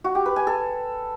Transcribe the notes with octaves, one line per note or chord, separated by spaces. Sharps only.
F#4
G4
B4
G#5
A4